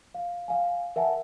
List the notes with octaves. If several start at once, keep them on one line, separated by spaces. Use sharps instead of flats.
F5
F5 G#5
A#4 E5 F#5 G#5 A5